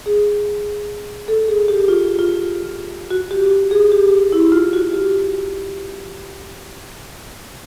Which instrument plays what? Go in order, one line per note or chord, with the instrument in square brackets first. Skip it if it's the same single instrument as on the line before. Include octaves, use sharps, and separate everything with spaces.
[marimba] G#4
A4
G#4
G4
F4
F4
F#4
G4
G#4
G4
E4
F4
F#4
G4